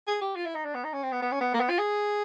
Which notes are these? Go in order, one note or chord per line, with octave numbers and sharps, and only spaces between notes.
G#4
G4
F4
E4
D#4
D4
B3
D#4
C#4
C4
B3
B3
C#4
B3
A#3
B3
F4
G#4